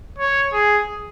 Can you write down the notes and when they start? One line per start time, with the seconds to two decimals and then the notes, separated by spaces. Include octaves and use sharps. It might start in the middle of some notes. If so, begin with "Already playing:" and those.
0.19 C#5
0.53 G#4